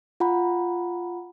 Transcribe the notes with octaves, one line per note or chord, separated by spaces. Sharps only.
F4 F#5 A#5 B5